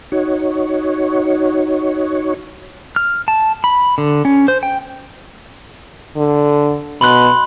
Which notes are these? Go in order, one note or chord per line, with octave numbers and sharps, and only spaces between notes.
D#4 F#4 C#5
F6
A5
B5
D3
C#4
C5
G5
D3
B2 B5 C6 F#6